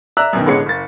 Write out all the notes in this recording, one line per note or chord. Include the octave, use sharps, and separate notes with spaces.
D5 E5 A#5 E6 F#6
F#2 B2 D#3
A1 D3 G#3 B3 C#4 C#7
F#1 A6